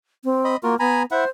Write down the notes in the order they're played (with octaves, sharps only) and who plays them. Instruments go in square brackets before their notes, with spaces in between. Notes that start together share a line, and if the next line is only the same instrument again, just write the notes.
[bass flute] C4
[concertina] D#5 B5
[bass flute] A#3 [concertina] F4 F#4 A#4
[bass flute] B3 [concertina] G#5 A#5 B5
[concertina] E4 E5 F#5 [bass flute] C5